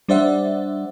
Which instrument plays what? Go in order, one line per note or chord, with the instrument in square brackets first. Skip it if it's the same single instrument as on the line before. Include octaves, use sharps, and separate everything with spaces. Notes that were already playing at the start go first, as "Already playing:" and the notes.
[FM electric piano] G3 D4 C5 D5 E5 F#5